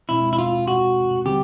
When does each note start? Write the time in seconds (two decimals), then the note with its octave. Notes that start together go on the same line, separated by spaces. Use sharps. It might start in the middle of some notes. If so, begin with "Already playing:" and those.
0.09 B2 G#3 C4 E4
0.33 E4
0.39 F4
0.68 F#4
1.25 D3 G3 C4 G4